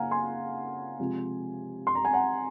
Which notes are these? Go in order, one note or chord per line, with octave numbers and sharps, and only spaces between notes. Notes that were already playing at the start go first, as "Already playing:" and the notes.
Already playing: C#3 A#3 F5 F#5 G#5 A#5
G#5 C6
C3 F3 G#3
C6
A#5
G#5
F#5 A#5